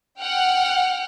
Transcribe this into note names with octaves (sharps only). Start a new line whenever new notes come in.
F#5 G5 F6